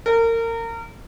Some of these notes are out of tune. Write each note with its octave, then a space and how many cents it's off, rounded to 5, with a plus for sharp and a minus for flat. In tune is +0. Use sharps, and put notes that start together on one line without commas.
A#4 -30